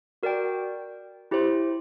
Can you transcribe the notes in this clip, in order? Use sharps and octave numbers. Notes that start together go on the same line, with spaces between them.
F#4 A#4 D5 G5
E4 G4 C5